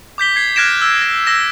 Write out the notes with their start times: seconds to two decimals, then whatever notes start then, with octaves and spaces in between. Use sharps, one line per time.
0.18 D6 G6 B6 G7
0.36 G#6 C7
0.56 F6 F#6 G#6 A#6 D7 E7
0.82 E6
1.01 A#6
1.26 E6 A#6 E7